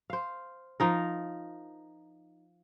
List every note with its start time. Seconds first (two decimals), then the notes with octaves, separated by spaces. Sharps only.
0.10 C5 F5
0.80 F3 D#4 A#4